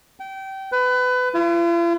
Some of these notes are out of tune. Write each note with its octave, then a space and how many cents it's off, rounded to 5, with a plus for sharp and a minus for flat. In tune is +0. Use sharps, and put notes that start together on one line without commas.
G5 -25
B4 +25
F4 -45